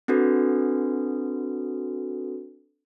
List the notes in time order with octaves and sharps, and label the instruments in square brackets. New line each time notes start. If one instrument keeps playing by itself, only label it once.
[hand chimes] C4 D4 F#4 A4 B4